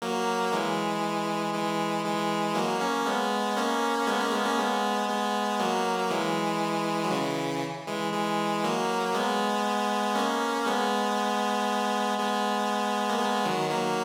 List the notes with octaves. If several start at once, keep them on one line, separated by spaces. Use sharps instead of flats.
F#3 A#3
E3 G#3
E3 G#3
E3 G#3
F#3 A#3
A#3 C#4
G#3 B3
A#3 C#4
G#3 B3
A#3 C#4
G#3 B3
A#3 C#4
G#3 B3
G#3 B3
F#3 A#3
A#3
E3 G#3
F#3
C#3 E3
E3 G#3
E3 G#3
F#3 A#3
G#3 B3
A#3 C#4
G#3 B3
G#3 B3
A#3
G#3 B3
D#3 F#3
F#3 A#3